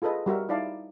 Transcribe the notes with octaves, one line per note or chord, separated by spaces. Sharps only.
F4 G#4 A4 B4 D#5
G3 F#4 A#4 E5
D#4 E4 D5 F5 A5